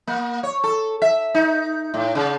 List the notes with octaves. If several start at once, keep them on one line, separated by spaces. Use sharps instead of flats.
A#3
C#5
A4
E5
D#4
A2
C#3